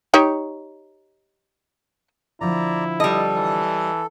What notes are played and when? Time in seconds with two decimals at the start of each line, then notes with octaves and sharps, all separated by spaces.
0.14 D#4 G4 C#5
2.41 D3 F3 E4 D5 A#5
3.00 G3 A4 D#5
3.36 E3